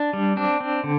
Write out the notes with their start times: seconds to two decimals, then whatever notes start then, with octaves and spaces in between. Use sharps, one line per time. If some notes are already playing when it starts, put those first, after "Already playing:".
Already playing: D4
0.13 G3
0.37 C4 D4
0.60 C4
0.84 D3